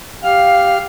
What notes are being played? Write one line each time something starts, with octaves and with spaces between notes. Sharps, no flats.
G4 F5 F6